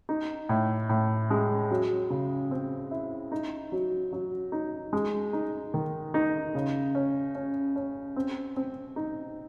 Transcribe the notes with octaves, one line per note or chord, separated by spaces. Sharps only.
D#4
A2
A2
G#3
F#3
C#3
C4
E4
D#4
F#3
F#3
D#4
G#3
D#4
D#3
D#4
C#3
C#4
C#4
C#4
C4
C4
D#4